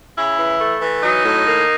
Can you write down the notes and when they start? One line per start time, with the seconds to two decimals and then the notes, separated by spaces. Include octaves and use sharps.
0.17 C#3 E4
0.38 E3
0.59 A3
0.80 E3
1.03 F#3 D#4
1.24 A2
1.45 A#3